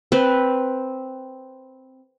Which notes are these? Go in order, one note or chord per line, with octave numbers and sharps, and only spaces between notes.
C4 B4